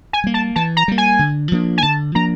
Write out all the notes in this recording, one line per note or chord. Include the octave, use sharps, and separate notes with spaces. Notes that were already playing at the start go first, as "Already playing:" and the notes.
G#5
G3 A#3
A5
E3 A5
A#5
G3 A#3
G#5
D3
F3 A#3 D4
G#5
D3 A5
F3 A#3 D4 A#5